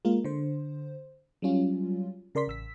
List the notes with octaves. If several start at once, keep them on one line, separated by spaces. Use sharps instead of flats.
G#3 A#3 F4 A#4
D3 C5
F#3 G3 C#4 F4
C#3 A#4 D5 C6 B6
A1 E6 B6